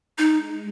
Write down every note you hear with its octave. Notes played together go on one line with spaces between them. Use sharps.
G#3 D#4